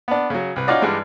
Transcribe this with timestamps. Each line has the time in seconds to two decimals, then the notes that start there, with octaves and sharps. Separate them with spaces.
0.08 B3 D4
0.30 C#3 F#3
0.56 C2 B4
0.67 C#4 D#4 F4 F#4 D5 D#5
0.82 G2 E3 G3 G#3